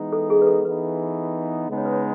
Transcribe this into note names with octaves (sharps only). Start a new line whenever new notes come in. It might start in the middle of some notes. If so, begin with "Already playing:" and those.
Already playing: E3 G#3 B3 D#4
A4
G#4
B4
A4
E3 B3 D#4 B4
C#3 G#3 B3 D#4
C#5
B4
C#5